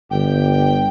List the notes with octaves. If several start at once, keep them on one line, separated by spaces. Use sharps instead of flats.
G1 G5